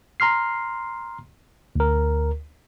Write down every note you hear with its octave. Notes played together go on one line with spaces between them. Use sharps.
A#5 C6 F6 C7
D2 A#4